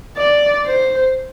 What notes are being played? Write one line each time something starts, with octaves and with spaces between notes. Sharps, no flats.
D5
C5